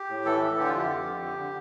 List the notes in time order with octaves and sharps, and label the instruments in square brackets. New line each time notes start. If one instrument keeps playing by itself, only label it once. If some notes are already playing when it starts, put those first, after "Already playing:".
Already playing: [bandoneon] G4
A2
E3 A4
E3
D3 G4
F4
F2 G4
F2
F2
D3
D3